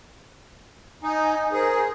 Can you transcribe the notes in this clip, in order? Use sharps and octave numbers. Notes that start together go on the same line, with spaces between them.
D#4 G#5
G#4 A#4 C5